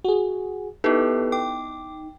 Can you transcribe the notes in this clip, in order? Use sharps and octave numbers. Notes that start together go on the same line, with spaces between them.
F#4 G#4
B3 D#4 E4 G4 A4 B4
G5 D6